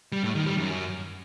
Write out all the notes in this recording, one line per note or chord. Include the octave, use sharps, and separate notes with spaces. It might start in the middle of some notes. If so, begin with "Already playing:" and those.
G3
A2
D#3
G3
F#2